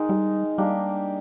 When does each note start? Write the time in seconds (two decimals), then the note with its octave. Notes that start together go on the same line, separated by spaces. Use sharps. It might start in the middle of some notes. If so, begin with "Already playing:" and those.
Already playing: D#3 G#3 D#4
0.09 G3
0.58 G3 A#3 D4 G4